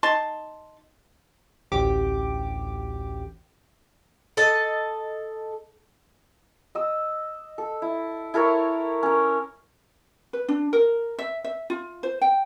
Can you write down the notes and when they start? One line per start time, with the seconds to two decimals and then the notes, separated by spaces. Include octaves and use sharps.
0.03 D#4 A5 C6
1.72 A1 D2 G4 D6
4.37 A4 D#5 A5
6.75 D#5 E6
7.58 A4
7.82 E4
8.34 E4 A4 A#4 C#5
9.03 C#4 A#4
10.33 B4
10.49 D4
10.73 A#4
11.19 E5
11.44 E5
11.70 F4
12.03 C5
12.21 G5